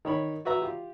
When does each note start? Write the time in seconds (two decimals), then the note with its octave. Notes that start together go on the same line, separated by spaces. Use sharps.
0.05 D#3 C#5 B5
0.45 F#4 B4 E5 A#5
0.62 F4 G4